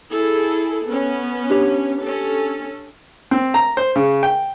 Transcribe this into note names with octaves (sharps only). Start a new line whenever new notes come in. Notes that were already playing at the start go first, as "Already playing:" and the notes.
E4 G#4 A4
B3 C#4
D4 G4 C#5
C#4 A4
C4
A#5
C5
C#3
G5